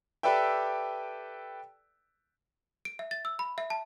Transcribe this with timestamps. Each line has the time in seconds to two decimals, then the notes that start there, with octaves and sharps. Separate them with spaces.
0.23 G4 A4 B4 D5 E5 G5
2.85 D7
2.99 E5
3.11 A6
3.25 E6
3.39 B5
3.58 E5
3.70 A5